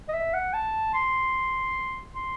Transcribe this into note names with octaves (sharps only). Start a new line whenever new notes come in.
D#5
E5
F#5
A5
C6
C6